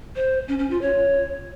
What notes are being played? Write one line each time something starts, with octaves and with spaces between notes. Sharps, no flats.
C5
C#4
C#4
F4
C#5